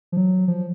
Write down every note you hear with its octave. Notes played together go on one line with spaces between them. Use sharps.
F3
F#3
F3